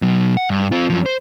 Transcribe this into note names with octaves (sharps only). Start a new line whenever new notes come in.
B2 F#3
F#5
G2
C4 F4
F#2 F3
C5